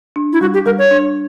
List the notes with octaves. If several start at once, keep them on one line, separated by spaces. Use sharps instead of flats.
D4
E4
G3 F#4
G4
G3 A#4
C#5
D4